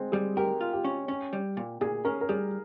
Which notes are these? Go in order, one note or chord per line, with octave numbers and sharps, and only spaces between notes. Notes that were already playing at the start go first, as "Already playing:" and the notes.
Already playing: G#3 C4
G3 G#4
G4 A#4
F4
G4
C#4
C#4
G3
A#2
A#2 G#4
C#4 A#4
A#4
G3 G#4